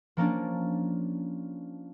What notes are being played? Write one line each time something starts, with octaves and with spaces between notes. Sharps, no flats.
F3 A#3 C#4 D4